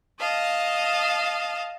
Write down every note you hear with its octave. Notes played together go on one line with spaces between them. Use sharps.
D#5 F5 A5